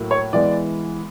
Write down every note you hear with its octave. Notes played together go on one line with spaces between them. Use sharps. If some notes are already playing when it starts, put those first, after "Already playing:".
Already playing: A2 F#3 A#3
C#5
E3 G#3 B3 D5